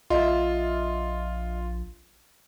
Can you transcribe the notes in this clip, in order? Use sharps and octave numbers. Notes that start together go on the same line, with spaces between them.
A#1 F4 D#5 E5